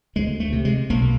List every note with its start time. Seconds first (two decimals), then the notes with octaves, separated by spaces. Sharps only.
0.16 D2 G#3
0.40 A3
0.52 C3
0.65 G#3
0.90 B1 A#3